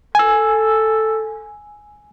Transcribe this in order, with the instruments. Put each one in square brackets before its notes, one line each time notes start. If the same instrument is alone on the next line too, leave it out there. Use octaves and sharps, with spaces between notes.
[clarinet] A4 [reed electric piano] G#5 E6